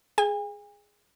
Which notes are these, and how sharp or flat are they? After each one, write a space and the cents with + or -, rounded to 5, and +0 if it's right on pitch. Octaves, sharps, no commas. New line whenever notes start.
G#4 +0 G#5 -45